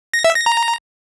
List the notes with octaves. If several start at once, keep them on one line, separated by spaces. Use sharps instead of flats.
A#6
E5
A#6
A#5